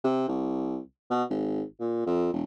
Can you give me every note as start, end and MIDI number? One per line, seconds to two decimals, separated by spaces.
0.04 0.24 48
0.28 0.78 36
1.10 1.23 47
1.30 1.62 32
1.80 2.04 46
2.06 2.30 41
2.33 2.43 28